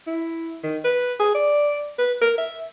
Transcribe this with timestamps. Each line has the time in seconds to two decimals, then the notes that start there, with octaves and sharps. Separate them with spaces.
0.07 E4
0.64 D#3
0.84 B4
1.20 G#4
1.35 D5
1.99 B4
2.21 A#4
2.38 E5